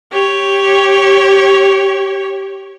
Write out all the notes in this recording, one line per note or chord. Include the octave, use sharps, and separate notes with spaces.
G4 C#5